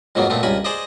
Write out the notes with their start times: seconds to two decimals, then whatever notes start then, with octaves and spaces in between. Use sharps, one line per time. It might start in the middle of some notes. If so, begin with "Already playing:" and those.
0.15 F2 G#2 F#3 A#3 B3
0.30 A#2 A3 B3 C4
0.43 C#2 G2 A#4 G#5 B5
0.65 G#4 C5 D5 D#5